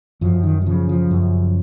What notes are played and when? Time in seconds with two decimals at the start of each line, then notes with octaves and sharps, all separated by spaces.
0.21 F#2 F3
0.43 D#3
0.62 F#3
0.66 C#3 F3
0.89 F3
1.11 F#2